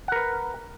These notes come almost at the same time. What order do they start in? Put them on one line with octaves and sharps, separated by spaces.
F#5 A#4 B4